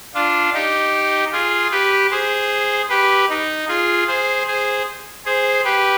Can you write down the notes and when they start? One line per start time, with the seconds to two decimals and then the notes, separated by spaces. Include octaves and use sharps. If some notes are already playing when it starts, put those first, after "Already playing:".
0.14 D4 F4
0.53 D#4 G4
1.32 F4 G#4
1.71 G4 B4
2.11 G#4 C5
2.89 G4 B4
3.29 D#4
3.68 F4 G#4
4.07 G#4 C5
4.47 G#4 C5
5.25 G#4 C5
5.64 G4 B4